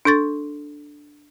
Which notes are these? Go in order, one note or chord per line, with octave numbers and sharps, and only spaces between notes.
D4 A4 C#6 A6